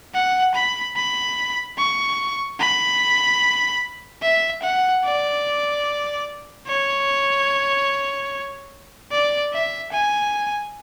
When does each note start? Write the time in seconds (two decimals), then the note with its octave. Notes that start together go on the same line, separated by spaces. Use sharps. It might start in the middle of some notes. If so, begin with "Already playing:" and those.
0.14 F#5
0.55 B5
0.96 B5
1.78 C#6
2.60 B5
4.22 E5
4.63 F#5
5.05 D5
6.67 C#5
9.12 D5
9.53 E5
9.93 G#5